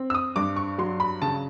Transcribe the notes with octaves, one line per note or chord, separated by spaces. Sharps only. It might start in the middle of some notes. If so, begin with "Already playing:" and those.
Already playing: C4
E6
D#6
G2 D6
C#6
F#3 C6
B5
C#3 A5